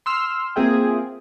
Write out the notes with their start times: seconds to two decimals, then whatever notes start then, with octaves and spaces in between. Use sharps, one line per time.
0.06 C6 E6 F6
0.56 A#3 C4 F4 G#4 E5 G5